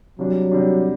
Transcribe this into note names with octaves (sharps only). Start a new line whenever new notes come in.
C3 F#3 G3 D4
C3 G3 D4